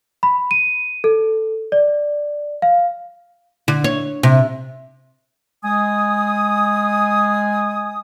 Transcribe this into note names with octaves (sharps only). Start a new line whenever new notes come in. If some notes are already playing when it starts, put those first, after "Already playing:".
B5
D#7
A4
D5
F5
D3
C#5
C3
G#3 G#5 D#6